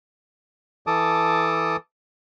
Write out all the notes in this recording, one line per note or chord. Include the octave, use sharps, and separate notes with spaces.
E3 A4 A5 D6 D#6